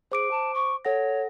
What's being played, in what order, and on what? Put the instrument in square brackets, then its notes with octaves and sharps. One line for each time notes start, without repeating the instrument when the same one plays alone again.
[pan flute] G#4 [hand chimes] C5 D6 D7
[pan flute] A5
C#6
[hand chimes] A4 F#5 A#6 [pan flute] C#5